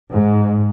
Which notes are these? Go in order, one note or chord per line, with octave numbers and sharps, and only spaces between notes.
G#2